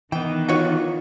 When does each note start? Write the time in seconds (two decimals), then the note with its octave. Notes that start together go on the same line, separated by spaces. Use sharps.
0.12 D#3 E3 B3 G5
0.49 D#4 F4 F#4 C#5